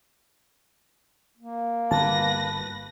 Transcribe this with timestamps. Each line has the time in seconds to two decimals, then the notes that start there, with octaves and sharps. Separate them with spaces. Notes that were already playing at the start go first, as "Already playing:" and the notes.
1.38 A#3
1.91 G1 B4 A5 A#6